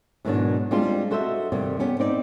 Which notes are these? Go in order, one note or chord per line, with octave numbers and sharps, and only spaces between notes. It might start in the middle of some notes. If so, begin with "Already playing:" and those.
G#2 B2 D#3 F#3 G#3 D4
G3 G#3 C4 D4 F4
F#4 A4 C5 D#5 E5
G2 C3 D#3 G3
B3 C#4 G4
C4 D#4 D5